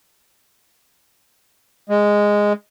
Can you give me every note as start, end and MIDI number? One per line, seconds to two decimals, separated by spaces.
1.90 2.53 56